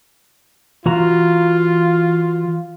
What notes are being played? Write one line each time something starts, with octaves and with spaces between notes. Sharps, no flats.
E3 F4 F#4 A#5